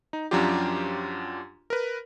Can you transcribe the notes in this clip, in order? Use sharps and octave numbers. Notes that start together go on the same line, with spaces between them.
D#4
F#2 F3 F#3 D4 F4 G4
A#4 B4